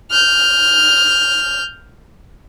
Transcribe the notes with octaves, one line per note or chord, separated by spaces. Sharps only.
F6 G6